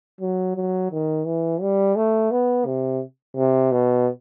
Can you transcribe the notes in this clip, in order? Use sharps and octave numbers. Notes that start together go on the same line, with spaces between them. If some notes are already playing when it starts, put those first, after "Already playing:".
F#3
F#3
D#3
E3
G3
A3
B3
C3
C3
B2